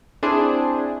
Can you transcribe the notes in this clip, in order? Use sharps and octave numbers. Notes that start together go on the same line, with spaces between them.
C4 D4 E4 G#4 C5